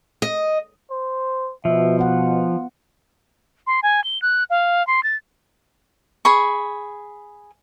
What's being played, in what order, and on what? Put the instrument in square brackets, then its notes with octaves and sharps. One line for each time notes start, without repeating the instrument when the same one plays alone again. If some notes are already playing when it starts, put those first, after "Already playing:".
[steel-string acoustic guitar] D#5
[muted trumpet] C5
[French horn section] B2 [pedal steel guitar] F3 [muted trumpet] E5
[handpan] B3 F#5 [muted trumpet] F4
[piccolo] C6
G#5
G7
F#6
F5
C6
A6
[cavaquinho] G#4 B5 C#6